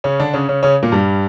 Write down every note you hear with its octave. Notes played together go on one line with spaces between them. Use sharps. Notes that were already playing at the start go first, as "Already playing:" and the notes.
C#3 C#4
D3 D4
C#3 C#4
C#3 C#4
C#3 C#4
A#2 A#3
G2 G3